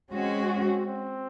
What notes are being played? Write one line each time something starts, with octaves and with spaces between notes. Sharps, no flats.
G#3 C4 C#4 F#4
C4
C4